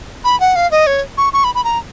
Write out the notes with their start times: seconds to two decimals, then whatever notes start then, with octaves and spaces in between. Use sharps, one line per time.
0.24 B5
0.40 F#5
0.56 F5
0.71 D#5
0.87 C#5
1.18 C#6
1.33 C#6
1.44 B5
1.55 B5
1.64 A#5